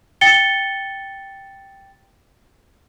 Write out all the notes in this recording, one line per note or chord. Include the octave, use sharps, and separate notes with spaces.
G5 A6 C#7 G7